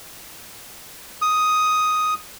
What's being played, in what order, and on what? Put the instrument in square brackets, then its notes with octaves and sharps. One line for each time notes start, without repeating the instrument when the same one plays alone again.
[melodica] D#6